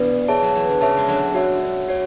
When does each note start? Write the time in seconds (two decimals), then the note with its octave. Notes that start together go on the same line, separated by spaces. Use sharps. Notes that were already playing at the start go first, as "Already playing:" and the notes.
Already playing: B2 E3 B3 D4 D5
0.28 G#4 C#5 E5 A5
0.42 F#3
0.55 E3
0.69 D3
0.81 C#3 G#4 C#5 E5 A5
0.97 G#3
1.08 D3 F#3
1.35 F#4 C#5 E5
1.88 F#4 C#5